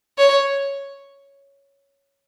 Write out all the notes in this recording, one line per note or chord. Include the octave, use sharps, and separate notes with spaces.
C#5